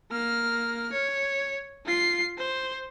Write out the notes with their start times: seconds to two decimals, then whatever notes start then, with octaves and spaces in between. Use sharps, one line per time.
0.11 A#3 F6
0.92 C#5
1.86 F4 C7
2.38 C5